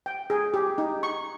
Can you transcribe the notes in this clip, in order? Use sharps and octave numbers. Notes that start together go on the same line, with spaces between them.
G5
G#4
G4
D#4
C#6